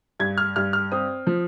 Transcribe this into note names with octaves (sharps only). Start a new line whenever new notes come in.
G2 G#6
F6
G2 F6
F6
C4 D#6
F3